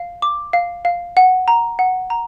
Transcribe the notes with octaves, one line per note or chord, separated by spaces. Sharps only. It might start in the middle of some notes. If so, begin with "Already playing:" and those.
Already playing: F5
D6
F5
F5
F#5
A#5
F#5
A#5